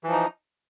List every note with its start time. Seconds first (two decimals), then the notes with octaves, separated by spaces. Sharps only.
0.04 E3
0.08 F3
0.12 D#4